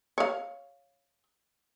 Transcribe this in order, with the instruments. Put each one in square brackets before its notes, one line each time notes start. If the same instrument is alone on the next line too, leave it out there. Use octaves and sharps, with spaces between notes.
[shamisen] C#5 F5